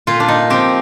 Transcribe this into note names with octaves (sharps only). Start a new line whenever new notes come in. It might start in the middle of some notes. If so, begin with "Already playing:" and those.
A#2 F4
D4
D#4
F3 C4 G4